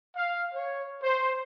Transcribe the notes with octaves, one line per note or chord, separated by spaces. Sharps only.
F5
C#5
C5